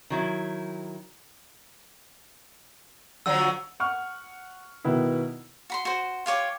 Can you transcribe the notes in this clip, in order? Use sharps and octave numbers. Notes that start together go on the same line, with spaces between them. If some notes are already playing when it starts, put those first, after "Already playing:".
D#3 F#3 E4
D3 F3 F#3 E6
F#5 C#6 F6
B2 D#3 B3 E4
F#4 B5 C6
F#4 C5
F4 G4 C#5 D6